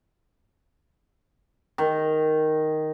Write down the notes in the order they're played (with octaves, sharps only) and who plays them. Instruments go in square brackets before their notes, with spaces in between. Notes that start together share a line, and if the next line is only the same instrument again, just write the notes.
[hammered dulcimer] D#3